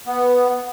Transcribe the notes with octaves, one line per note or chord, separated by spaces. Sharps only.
B3